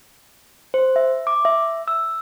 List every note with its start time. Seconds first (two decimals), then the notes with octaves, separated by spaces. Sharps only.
0.74 C5
0.96 E5
1.27 D6
1.45 E5
1.88 E6